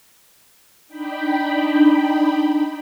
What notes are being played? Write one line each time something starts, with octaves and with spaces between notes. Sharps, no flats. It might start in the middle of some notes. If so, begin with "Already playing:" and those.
D4 D#4 G5 B5